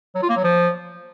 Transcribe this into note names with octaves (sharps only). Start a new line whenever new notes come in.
F#3
F4
A#3
F#3
F3